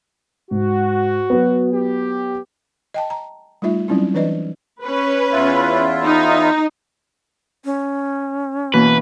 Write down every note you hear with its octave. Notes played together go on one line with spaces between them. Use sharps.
G#2 F#4
F#3 B3
G4
D#5 G5 A5
A#5
G3 A3 D#4 F4 E5
F#3 G3 C4 C#4 D#4 E4
E3 D4 B4 D5 D#5
C#4 B4
E2 E4 F4
D#4
C#4
B2 E3 A#3 B4